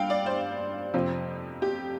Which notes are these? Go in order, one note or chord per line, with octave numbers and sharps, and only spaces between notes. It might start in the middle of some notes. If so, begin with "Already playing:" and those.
Already playing: G2 G3 F5 G5
D5
C5
F2 C3 F3 C4
G4